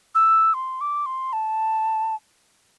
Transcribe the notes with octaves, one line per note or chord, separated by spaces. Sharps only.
E6
C6
D6
C6
A5